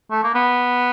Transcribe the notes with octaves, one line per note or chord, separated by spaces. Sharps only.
A3
A#3
B3